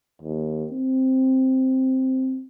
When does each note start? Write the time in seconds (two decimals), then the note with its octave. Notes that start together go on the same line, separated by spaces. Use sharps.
0.22 D#2
0.72 C4